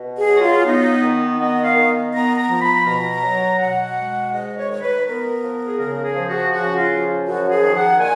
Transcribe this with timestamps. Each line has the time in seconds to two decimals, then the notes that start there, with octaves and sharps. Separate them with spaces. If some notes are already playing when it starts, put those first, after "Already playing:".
Already playing: B2
0.17 G#4
0.29 F#3
0.36 F#4
0.41 F4
0.66 B3 D#4
1.02 D#3
1.39 B3 D#5
1.63 F5
1.75 D#3
2.12 B3 A#5
2.36 A#5
2.49 F3
2.61 B5
2.85 B2 A#5
3.22 F#3
3.59 B2 F#5
3.95 G#3
4.32 G#2 D#5
4.57 C#5
4.69 D#3 C#5
4.81 B4
5.05 B3 A#4
5.42 F3
5.67 G#4
5.79 C#3 A#4
6.04 G#4
6.16 F3
6.28 F#4
6.52 C#3 F#4
6.77 F4
6.89 F3
7.26 F#2 F#4
7.50 G#4
7.62 D#3
7.75 F#5
7.99 A#2 G#5